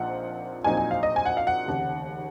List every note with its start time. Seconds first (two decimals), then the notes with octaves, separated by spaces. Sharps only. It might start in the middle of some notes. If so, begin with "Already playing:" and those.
Already playing: A#1 A#2 F3 C4 D#4 F#5
0.64 A#1 A#2 F#3 C4 D#4 G#5
0.77 G#5
0.91 F5
1.03 D#5
1.16 G#5
1.25 F#5
1.37 F5
1.47 F#5
1.66 F1 D#2 C#3